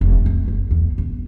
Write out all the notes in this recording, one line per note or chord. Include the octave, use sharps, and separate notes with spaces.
F1
A2
G#3
F#1
E2
G1